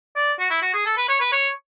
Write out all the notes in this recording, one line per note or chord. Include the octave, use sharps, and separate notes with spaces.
D5
F#4
E4
F#4
G#4
A4
B4
C#5
B4
C#5